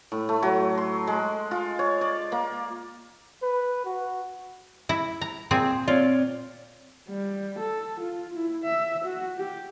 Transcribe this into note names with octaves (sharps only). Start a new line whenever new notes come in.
A2
A3
F#3
C6
G#3
F4
C#5
D5
A#3
B4
F#4
E4
A#5
A#2 C4 G#4
C4 F4 C#5 D5
G3
A4
F4
E4
E5
F#4
G4